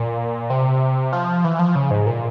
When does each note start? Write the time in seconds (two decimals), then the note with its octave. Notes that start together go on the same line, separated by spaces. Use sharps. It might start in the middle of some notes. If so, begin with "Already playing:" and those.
Already playing: A#2
0.50 C3
1.13 F3
1.44 E3
1.59 F3
1.75 C#3
1.91 G#2
2.06 A#2